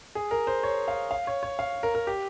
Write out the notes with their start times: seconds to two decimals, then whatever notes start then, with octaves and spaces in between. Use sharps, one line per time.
0.15 G#4
0.31 A#4
0.47 C5
0.63 C#5
0.88 F5
1.11 F5
1.27 C#5
1.43 C#5
1.59 F5
1.83 A#4
1.95 A#4
2.07 G4